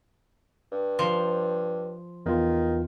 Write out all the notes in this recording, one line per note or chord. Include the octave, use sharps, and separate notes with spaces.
G2
F3
E2 D#3 F4